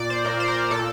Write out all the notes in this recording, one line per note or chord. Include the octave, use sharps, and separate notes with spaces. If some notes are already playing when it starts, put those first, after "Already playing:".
Already playing: A#2 D5
C5
A#2 A#4
C5
A#4
A#2 A4